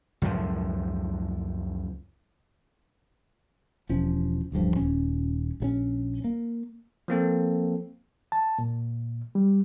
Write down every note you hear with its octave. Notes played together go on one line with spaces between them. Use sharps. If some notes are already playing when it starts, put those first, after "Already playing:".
C#2 F#2 A2 F3
E1 F3 C#4
D1 A1 G2 F3
D#1 C#4
A#1 F#3 C#4
A#3
F3 A#3 C4 A4
A5
A#2
G3